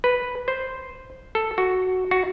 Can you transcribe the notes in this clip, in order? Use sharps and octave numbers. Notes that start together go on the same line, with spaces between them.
B4
C5
A4
F#4
F#4